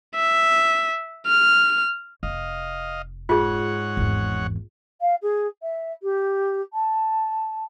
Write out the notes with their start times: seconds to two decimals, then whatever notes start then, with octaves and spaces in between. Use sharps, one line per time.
0.15 E5
1.27 F6
2.23 F1 D#5 F5
3.29 G#2 F4 G#4 C#5 F#5
3.97 G#1 E2
5.01 F5
5.22 G#4
5.62 E5
6.02 G4
6.73 A5